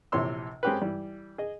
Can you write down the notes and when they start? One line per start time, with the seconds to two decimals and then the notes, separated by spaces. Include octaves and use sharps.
0.12 A#1 C3 E3 C#5 C6 E6
0.63 G#3 C4 C#4 G4 A#4 B4
0.82 E3 G3
1.38 G#4 D#5